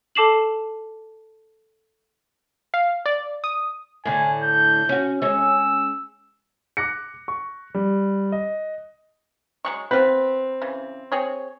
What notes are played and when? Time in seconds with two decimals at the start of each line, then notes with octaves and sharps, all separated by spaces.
0.15 A4 A5 D6 C7 E7 F#7
2.74 F5
3.06 D5
3.44 D#6
4.05 A2 D3 G#5
4.44 G6
4.89 C#4 F#4
5.22 G#3 C#4 E6
6.77 D6 F#6 A#6 C#7
7.28 C#6
7.74 G3
8.32 D#5
9.65 F#3 G#3 C#6
9.91 B3 C4 F4 B4
10.61 C#3 E3
11.12 C4 G#4 C#5